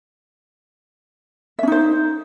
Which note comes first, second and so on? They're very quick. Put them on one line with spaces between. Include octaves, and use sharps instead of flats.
E5 C#4 D#4 C5